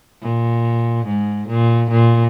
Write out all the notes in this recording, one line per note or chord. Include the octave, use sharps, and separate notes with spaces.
A#2
G#2
A#2
A#2